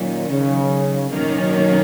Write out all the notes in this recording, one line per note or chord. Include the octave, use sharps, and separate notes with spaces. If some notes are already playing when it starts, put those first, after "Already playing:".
Already playing: A#2 D#3 F#3 C#4
C#3
F#2 B2 D#3 F#3 A#3 C#4